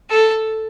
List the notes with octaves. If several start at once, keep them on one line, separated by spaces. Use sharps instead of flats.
A4